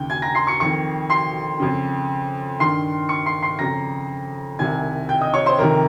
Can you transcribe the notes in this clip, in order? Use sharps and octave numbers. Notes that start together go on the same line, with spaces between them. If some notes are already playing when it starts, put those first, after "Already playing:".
Already playing: D#2 C#3 G5 G6
G#5 G#6
A#5 A#6
C6 C7
C#6 C#7
F2 D#3 C#6 C#7
C6 C7
F2 C#3
G2 D#3 C6 C7
C#6 C#7
C6 C7
C6 C7
F2 C#3 A#5 A#6
C2 C3 D#3 G#5 G#6
G5 G6
D#5 D#6
C#5 C#6
C5 C6
F2 C3 D#3 A#4 A#5